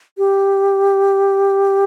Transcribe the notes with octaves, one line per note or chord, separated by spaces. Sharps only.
G4